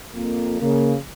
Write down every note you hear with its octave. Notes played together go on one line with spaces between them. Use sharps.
F2 A#3
C#3 A#3